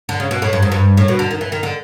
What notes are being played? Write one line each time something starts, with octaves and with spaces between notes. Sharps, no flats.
D3
C#3
B2
A2
G2
G#2
G2
A2
B2
D3
D#3
E3
D#3
D3